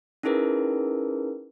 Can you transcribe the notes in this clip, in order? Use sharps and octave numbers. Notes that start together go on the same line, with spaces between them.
C#4 D#4 E4 G#4 A#4 B4